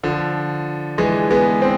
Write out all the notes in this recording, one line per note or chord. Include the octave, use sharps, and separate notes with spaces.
D3 F3
E3 G#3
G#3 B3
C4